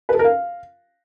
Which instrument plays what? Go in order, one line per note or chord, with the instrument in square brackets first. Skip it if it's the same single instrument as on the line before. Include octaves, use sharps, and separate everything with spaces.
[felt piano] B4
A4
A#4
F5